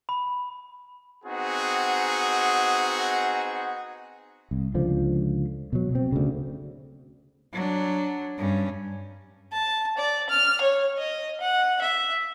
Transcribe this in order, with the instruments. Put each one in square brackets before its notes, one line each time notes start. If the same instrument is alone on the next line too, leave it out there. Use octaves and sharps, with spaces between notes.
[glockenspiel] B5
[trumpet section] B3 C4 D#4 F#4 G#4 F#5
[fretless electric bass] C2
C#2 D3 F3
B2 F#3
B2 C4
D2 C#3
[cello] F#3 D4
G2 C#4
[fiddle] A5
D5
F6
C#5
D#5
F#5
E5